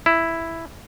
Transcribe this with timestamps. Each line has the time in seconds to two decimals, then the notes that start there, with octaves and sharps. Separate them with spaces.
0.06 E4